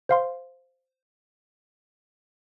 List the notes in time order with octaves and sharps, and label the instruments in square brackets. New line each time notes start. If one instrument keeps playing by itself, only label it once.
[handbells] C5 F5 C6